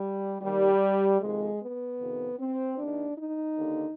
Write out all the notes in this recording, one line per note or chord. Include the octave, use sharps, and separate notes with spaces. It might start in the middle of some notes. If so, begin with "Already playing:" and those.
Already playing: G3
D#2 D#3 G3
F2 C3 D#3 G#3
B3
F2 C3 D#3
C4
D#2 D#3 D4
D#4
D#2 D3